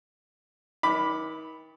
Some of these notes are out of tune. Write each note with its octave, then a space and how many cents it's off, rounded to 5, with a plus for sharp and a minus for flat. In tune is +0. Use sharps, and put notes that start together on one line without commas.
D#3 +35 B5 +0 D6 +0